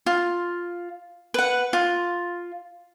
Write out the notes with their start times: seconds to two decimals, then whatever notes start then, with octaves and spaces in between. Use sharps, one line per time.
0.06 F4
1.34 B4 F#5
1.73 F4